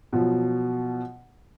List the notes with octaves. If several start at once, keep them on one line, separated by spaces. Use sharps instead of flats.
B2 F3 F#3